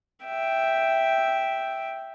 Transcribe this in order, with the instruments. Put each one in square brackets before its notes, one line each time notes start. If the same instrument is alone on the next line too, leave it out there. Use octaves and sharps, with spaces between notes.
[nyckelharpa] E5 G5